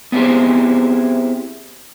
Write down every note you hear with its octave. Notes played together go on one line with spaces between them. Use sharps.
B3 C4 E4 G4 G#4 C5